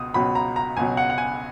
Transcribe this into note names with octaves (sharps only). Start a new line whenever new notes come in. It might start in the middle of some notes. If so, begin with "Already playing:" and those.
Already playing: C#2 B2 D#6
C#2 B2 F#3 B5
A#5
A#5
C#2 B2 F#3 G#5
F#5
F#5
G#5